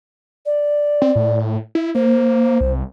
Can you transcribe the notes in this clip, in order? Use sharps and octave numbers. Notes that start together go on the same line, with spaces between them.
D5
C4
A2
E4
A#3 C5
C2